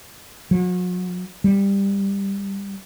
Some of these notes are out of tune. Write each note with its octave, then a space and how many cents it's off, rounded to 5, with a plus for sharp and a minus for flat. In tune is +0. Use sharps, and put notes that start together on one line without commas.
F#3 -40
G3 +15